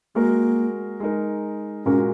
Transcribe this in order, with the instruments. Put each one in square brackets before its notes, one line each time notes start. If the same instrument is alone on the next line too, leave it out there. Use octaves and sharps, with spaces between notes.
[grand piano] G#3 F#4 A#4 [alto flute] A#3
[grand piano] G#3 D#4 A#4
[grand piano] A#2 G#3 F#4 A#4 [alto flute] C#4